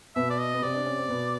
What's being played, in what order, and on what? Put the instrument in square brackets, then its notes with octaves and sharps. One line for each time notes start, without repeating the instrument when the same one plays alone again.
[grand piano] B2 B3 [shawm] E5
[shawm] D5
D#5
[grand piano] B3
[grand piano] C3 C4 [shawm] D5
[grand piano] D4
C#4
C4
B2 B3